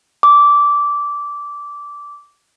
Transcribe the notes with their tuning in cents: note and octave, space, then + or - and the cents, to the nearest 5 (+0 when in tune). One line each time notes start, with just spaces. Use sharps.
D6 -15